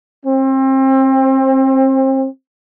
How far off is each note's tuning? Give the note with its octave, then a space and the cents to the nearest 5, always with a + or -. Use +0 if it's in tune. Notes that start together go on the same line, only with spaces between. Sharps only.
C4 +30